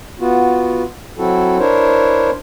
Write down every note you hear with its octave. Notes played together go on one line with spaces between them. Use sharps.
B3 F4 F#4
F#3 C4 E4 F#4 A4
D4 E4 A#4 C5 C#5